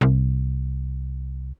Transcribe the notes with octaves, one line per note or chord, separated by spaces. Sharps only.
C2